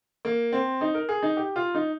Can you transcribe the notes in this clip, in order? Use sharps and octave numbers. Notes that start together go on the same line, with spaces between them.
A#3
C4
D#4
A#4
G#4
D#4
G4
F4
D#4